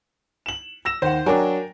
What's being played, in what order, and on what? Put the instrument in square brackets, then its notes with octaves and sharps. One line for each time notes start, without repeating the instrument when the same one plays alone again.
[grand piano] E7 F#7
E6 A#6 E7
[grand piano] D#2 F#5 [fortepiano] C5
[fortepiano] F#3 D4 [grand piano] A#4 G5 G#5